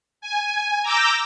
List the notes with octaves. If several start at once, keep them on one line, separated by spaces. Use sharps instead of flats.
G#5
A#5 D6 E6 G6 A#6